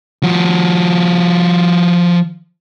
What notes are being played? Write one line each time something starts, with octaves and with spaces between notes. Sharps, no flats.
F3 F#4